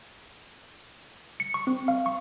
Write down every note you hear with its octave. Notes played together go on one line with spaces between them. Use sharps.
C#7
C#6
C4
F5
C#6